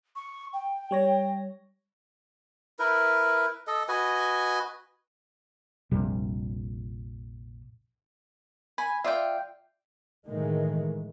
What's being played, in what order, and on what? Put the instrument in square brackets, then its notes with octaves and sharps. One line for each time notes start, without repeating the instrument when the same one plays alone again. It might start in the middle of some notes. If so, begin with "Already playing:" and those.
[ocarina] C#6
G5
[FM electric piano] G3 C#5 A#6
[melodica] E4 A#4 B4
A4 D#5
F#4 B4 D#5 G#5
[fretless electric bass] A#1 F2 C3 G3
[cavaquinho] G#5 [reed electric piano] B5
[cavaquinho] F4 G5 [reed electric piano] D5 E5
[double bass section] A2 D#3 E3 G#3